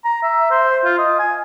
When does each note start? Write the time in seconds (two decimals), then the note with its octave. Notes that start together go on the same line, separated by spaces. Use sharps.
0.05 A#5
0.23 E5
0.51 C5
0.85 F4
0.99 D#5
1.19 G#5